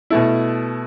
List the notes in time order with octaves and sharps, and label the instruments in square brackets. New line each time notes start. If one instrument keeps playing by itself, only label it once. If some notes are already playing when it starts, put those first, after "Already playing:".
[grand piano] B2 A3 E4